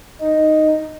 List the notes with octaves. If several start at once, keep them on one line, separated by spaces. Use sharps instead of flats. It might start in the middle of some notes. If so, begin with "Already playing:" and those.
D#4